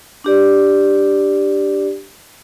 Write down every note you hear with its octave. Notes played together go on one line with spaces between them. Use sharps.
D4 G4 D5